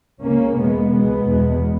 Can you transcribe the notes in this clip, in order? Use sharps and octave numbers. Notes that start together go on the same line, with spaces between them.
C#2 C#3 A#3 C#4
E2 B2 G#3 B3
C#2 B2 G#3 B3
E2 B2